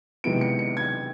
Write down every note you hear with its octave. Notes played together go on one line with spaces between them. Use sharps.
C3 D#3 G#3 B3 E4 D7
C#7
C#7
G#6